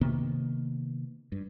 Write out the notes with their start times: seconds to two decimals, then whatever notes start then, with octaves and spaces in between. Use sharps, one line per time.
0.01 C3 D#3 A#3 B3
1.32 G2